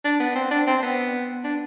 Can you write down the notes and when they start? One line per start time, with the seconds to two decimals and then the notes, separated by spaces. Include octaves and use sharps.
0.05 D4
0.20 B3
0.35 C4
0.51 D4
0.67 C4
0.83 B3
1.44 D4